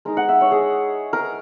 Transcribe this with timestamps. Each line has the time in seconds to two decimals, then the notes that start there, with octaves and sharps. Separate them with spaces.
0.05 G#3 D#4 A#4
0.17 F#5
0.29 E5
0.41 C#5
0.51 G#4
1.13 A#4